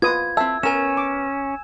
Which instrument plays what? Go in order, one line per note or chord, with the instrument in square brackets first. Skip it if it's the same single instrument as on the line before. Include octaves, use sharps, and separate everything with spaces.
[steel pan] F4 B4 D#6 [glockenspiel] G#6
[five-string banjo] C4 A5 [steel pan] E5 [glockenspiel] E6
[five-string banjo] B3 A#4 [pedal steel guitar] C#4 [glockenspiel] G#5 E7
[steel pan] D6